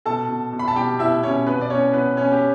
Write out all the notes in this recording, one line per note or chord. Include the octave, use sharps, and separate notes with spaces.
B2 A4 A5
B2
B2
B5
A5
B2 G4 G5
B2 E4 E5
B2 C#4 C#5
B2 B3 B4
D5
B2 C#4 C#5
B2 B3 B4
B2 C#4 C#5
G4
B2